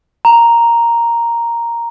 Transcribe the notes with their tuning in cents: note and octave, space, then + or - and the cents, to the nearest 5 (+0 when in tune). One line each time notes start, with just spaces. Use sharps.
A#5 +0